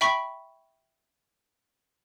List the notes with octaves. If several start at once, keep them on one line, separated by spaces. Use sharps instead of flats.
E5 G5 B5 C#6 B6